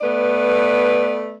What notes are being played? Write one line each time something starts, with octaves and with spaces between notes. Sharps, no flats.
A3 B3 B4 D5